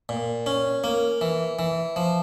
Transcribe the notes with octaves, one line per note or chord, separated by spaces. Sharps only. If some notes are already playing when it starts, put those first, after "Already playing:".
A#2
C#4
A#3
E3
E3
F3